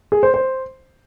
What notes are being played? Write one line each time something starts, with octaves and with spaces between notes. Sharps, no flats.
G#4
C5
C5